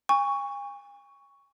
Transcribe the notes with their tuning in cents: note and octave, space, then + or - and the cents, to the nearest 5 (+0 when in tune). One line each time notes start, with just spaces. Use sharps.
G#5 -40 C#6 +10